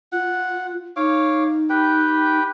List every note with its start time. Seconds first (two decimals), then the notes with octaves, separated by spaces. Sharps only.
0.12 F4 F#5
0.96 D#4 C#5 F5 D6
1.70 G4 B4 G5